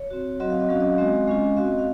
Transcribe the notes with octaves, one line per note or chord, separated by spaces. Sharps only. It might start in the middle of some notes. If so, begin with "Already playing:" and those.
Already playing: C#5
C4 F#4
F#3 C4 F#4 D#5
F5
D#5
F#3 C#4 F#4 F5
D#5
F5
G#3 C4 F#4 D#5
G#3 C#4 F4
C4 F#4 F5
D#5
F5